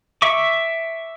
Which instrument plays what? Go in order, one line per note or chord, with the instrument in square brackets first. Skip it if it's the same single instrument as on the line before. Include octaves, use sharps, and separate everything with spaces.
[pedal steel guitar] E5 C#6 D6